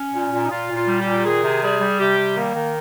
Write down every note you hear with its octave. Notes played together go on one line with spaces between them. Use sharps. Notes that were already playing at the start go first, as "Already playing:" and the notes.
Already playing: C#4
A#2
A#2
D#4
A#2 F4
A#2
F4
G3
G4
A#2
D#3 G#4
C3
G3 G#4
G3
C3 G4
G3
D#3 A#3
D#3